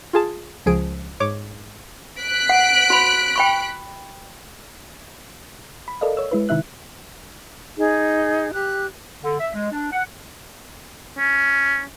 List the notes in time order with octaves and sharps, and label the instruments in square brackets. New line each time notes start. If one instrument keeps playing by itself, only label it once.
[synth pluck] F4 G#4 A5
C#2 F3 G#4 D7
G#2 C#5 D6
[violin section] F#6 B6 D7
[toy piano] F#5
F#4 B5
G5 B5 C#6
[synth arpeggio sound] B5
A4 A#4 D5 D#5 F5
C#5 E6
G#3 E4 B4
C3 D#3 D#4 E4 E5 F#6
[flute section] D#4 G#4
G4 F#6
[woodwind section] D3
E5
G#3
D4
F#5
[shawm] C#4